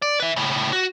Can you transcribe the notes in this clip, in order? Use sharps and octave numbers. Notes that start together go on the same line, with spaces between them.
D5
B4 E5
A2 C#3
F#4